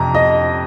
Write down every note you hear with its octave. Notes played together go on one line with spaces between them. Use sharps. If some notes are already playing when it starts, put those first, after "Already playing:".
Already playing: F2 C3 A#5
D#5